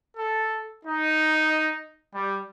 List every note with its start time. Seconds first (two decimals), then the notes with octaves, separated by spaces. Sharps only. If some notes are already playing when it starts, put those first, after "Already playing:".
0.17 A4
0.85 D#4
2.14 G3